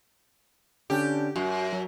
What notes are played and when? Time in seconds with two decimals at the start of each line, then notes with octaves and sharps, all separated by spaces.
0.90 D3 C#4 D4 G4
1.36 F#2 F#4
1.73 F#3